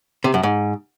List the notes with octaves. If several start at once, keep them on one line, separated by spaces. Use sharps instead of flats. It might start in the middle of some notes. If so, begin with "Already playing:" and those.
C3
F#2
G#2